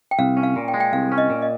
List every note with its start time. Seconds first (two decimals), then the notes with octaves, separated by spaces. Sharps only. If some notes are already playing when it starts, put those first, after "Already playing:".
0.11 G5
0.19 C2 F5
0.37 C#4
0.43 F5
0.56 A#2
0.68 G5
0.74 G#3
0.80 G5
0.93 C2 F5
1.12 C#4
1.18 D#5
1.30 A#2
1.42 D#5